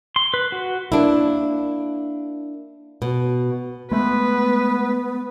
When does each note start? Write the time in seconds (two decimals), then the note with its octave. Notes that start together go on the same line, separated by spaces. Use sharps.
0.16 C6
0.34 B4
0.52 F#4
0.92 A#3 D4 E4
3.02 B2
3.91 G#3 A3 B3 B4